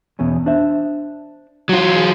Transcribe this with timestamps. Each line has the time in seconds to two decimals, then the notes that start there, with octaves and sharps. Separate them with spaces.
0.19 E2 B2 C#4
0.46 D4 C5 E5
1.69 F#3 F4
1.96 G#4